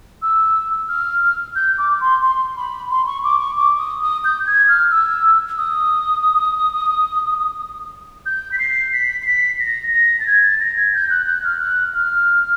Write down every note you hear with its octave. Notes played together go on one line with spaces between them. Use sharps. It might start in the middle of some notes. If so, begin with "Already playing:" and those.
E6
F6
G6
D6
C6
C6
B5
C6
C#6
D6
C#6
D6
D#6
D#6
G6
G#6
F6
E6
D#6
G6
B6
C7
B6
C7
B6
A#6
A#6
A6
G#6
A6
A#6
G#6
G6
F#6
F#6
F6
F#6
F6